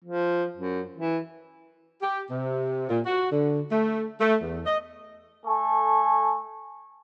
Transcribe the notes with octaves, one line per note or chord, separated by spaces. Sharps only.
F3
F#2
E3
G4
C3
A#2
F#4
D3
A3
A3
E2
D#5
A3 A4 G#5 C#6